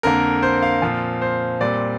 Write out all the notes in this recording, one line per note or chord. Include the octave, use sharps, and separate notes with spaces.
F2 D3 A#3 A#4
C5
F5
A#2 F3 C4
C5
A#2 G3 C4 D5